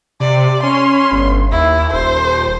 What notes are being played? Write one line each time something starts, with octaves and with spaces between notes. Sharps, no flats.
C3 D5
C#4 C6
G1
D#2 E4
D#1 C5